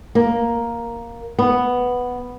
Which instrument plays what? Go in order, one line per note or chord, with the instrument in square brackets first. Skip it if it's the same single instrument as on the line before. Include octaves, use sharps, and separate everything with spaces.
[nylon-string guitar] A#3
B3